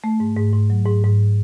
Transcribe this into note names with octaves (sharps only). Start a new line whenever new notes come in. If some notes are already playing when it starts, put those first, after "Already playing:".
A3
G#2
G#2
G#2
F#3
G#2
G#2